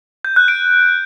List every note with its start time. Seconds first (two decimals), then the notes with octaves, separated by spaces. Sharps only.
0.25 G6
0.36 F#6
0.48 D7